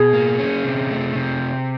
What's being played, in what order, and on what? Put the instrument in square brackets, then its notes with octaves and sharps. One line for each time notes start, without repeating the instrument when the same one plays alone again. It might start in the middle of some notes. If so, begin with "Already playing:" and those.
Already playing: [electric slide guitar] B2 [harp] G#4
[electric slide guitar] A#3
C#4
C3
A3
C3